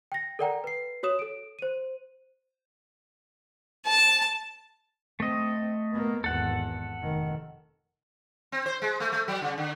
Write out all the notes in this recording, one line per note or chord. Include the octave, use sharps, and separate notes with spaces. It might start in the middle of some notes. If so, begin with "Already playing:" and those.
G5 A#6
A4 A#4 D5 F#5 G5 A#5
B4 C7
F#4 C#5 D#6 E7
A4 D7
C5 D#7
A5
A3 C4 D#5
A#3 B3
G#1 E2 A4 F#5
F1 D#3
C4
C5
G#3
A3
A3
F#3
C#3
D3